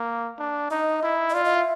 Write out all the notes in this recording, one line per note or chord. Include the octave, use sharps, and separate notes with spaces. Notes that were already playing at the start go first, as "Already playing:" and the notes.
Already playing: A#3
D4
D#4 D#5
E4
D#5
F4 D5
D#5
E5